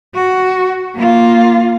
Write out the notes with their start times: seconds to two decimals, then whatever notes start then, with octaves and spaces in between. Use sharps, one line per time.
0.14 F#4
0.95 A#3 F4